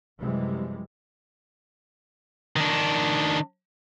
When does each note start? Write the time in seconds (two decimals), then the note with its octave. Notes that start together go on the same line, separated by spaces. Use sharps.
0.20 F#2 C3 E3 F3 G3 G#3
2.56 D#3 D4